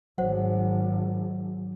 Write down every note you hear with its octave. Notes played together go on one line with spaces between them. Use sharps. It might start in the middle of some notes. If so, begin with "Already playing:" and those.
G#1 F#3 C5 F#5